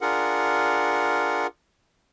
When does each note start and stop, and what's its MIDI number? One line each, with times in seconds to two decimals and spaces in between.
0.01 1.47 62
0.01 1.47 65
0.01 1.47 68
0.01 1.47 70
0.01 1.47 78